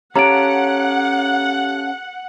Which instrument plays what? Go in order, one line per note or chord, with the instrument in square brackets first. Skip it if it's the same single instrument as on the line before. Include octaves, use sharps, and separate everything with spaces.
[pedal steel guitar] C#4 A4 F5 [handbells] G4 C#5 [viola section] F#5 [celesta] A#5 D7